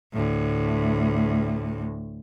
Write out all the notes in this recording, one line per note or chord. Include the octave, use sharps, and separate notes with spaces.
D2 A2